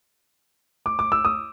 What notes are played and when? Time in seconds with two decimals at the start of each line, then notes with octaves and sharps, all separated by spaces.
0.86 D6
0.99 D6
1.12 E6
1.25 D#6